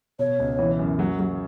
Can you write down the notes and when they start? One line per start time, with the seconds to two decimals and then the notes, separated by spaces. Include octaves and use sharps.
0.19 B2 C#5
0.40 C#2
0.59 E3
0.79 F#2
0.99 F#3
1.19 F#3